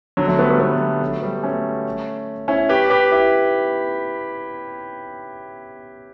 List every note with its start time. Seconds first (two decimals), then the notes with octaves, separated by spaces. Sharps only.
0.17 D3 F#3
0.28 F#3 A3
0.38 G3 B3
0.49 G3 B3
0.59 G3 B3
0.73 F#3 A3
1.01 F#3 A3
1.22 G3 B3
1.43 A3 C#4
2.48 C#4 E4
2.69 G4 B4
2.90 G4 B4
3.12 E4 G4